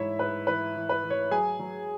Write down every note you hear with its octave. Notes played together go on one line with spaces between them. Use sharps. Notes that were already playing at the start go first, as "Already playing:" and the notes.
Already playing: G#2 E3 E4 C#5 E5
G#2 B4
E3 B4
E3
B4
E3
C#5
F#3 G#4 G#5
F#3